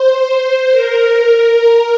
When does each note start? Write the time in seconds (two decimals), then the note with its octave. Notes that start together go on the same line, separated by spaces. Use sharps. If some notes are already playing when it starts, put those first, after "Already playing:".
Already playing: C5
0.72 A#4